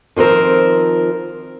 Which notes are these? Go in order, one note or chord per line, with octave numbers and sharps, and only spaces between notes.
D#3 F3 C4 A#4